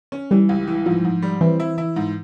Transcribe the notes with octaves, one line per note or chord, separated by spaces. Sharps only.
C#4
E3 G3
C#2
E3
G#2 F3
G#2
G3
E3 C4
E4
E4
G#2